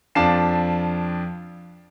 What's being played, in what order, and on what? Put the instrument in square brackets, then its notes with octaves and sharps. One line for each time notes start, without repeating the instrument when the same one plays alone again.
[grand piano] F2 D4 F4 A5 C7 E7